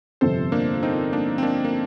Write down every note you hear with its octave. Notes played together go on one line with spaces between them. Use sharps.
G1 F2 C3 A4 C5
A#3 D4
C4 D#4
A#3 D4
C4
A#3 D4
A#3